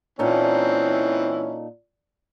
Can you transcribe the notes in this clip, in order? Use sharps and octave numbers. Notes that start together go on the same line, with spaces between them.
A#2 E3 C4 C#4 D#4 E4 A4